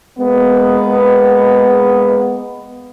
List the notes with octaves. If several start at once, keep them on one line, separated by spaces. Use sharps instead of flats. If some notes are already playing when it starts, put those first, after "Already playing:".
G#3 A#3 B3